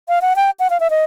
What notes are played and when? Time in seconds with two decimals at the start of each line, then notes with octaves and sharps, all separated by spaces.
0.09 F5
0.22 F#5
0.36 G5
0.60 F#5
0.70 F5
0.80 E5
0.90 D#5